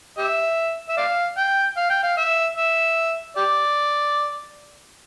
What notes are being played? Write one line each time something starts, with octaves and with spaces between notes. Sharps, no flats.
G4 E5
E5
D5 F5
G5
F5
G5
F5
E5
E5
G4 D5